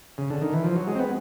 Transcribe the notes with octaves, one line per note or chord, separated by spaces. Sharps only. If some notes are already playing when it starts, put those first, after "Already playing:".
C#3
D3
D#3
E3
F3
F#3
G#3
C4
B3